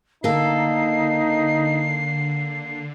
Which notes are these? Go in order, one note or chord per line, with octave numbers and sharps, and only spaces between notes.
D3 A#3 D#4 A4 C7